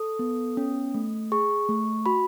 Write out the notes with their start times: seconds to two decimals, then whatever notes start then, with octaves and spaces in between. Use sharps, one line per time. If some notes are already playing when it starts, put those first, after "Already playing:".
Already playing: A4 D#6
0.19 B3
0.57 C#4
0.94 A3
1.32 G#4 C#6
1.69 A3
2.06 F#4 B5